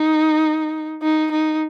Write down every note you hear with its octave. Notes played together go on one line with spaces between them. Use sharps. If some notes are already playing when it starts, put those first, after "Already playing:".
Already playing: D#4
D#4
D#4